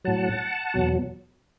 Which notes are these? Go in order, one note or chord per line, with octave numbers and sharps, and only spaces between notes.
A2 F#3 F#5 A5
E2 B2 F#3